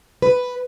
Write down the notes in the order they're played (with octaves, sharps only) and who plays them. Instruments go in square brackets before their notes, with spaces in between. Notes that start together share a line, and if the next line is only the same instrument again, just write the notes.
[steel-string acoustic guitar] B4